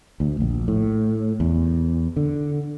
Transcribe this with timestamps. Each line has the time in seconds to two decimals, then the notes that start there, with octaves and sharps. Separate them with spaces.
0.20 D2
0.40 A#1
0.68 A2
1.40 E2
2.16 D3